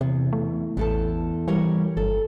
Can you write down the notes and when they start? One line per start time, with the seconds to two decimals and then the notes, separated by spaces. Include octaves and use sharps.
0.01 E2 C3
0.33 A3
0.77 A1 E2 A4 A5
1.48 E3 G3 A#4 C#5
1.97 G1 A4